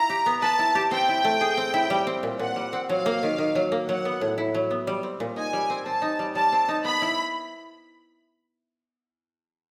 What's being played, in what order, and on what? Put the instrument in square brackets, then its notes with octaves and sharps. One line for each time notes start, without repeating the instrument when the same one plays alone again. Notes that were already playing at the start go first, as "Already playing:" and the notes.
Already playing: [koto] E4 F4 [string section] A#5
[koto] G4
B3
[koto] B4 [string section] A5
[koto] E4
G4
[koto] C4 [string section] G5
[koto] E4
A3
G#4
C4
E4
G3
C4
A#2
[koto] A#2 [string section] F#5
[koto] G3
C4
[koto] F#3 [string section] F5
[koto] A#3
D#3
D#3
F#3
A#3
[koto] F#3 [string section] F#5
[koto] B3
A2
E4
F#3
B3
G3
C4
A#2
[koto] D#4 [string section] G#5
[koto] G3
C4
[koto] C4 [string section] A5
[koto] D#4
G3
[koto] G3 [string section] A5
[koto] C4
D#4
[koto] B3 [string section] B5
[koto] E4